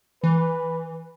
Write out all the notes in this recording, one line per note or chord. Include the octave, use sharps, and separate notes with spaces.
E3 B4